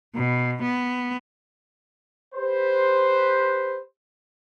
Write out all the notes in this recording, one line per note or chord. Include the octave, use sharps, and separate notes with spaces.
B2
B3
G4 B4 C5